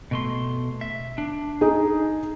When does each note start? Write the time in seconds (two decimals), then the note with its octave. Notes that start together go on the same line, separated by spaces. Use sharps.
0.11 B2 A3 C6
0.81 E5
1.18 D4
1.61 D#4 G#4